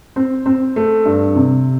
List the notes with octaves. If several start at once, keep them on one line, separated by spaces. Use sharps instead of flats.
C4
C4
A3
G2
C3